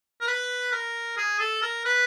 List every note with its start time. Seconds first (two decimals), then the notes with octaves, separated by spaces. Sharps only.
0.21 A#4
0.27 B4
0.72 A#4
1.17 G#4
1.39 A4
1.62 A#4
1.85 B4